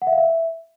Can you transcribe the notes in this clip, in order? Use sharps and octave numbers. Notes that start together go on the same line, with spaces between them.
F#5
E5
F5
E5